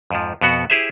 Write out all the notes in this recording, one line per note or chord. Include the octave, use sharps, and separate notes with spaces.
F2 G#2 F3
F2 B2 B3 F#4 F#5
E4 G4 G#4 C5 E5